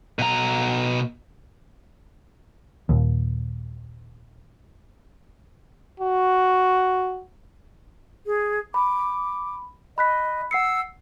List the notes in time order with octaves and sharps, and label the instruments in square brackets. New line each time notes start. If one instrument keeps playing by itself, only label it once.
[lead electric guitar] B2 A#5
[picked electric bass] D#1 D#2
[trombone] F#4
[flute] G#4
[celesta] B5 [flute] D6
[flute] D#5 [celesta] B5 F#6 B6
[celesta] F#5 C7 C#7 [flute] E6